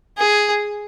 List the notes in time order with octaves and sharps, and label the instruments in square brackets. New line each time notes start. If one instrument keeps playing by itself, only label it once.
[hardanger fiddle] G#4